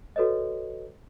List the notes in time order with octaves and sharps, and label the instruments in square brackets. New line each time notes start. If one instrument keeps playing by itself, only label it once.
[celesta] F#4 A4 B4 C#5 D#5